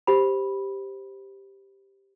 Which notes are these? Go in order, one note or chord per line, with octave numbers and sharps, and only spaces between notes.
G4 C5 B5